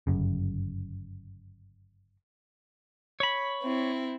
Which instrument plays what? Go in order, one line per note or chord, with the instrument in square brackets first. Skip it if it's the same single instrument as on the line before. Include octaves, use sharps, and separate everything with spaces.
[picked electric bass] G1 F#2 C#3
[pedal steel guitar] C#5 B5
[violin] C4 E4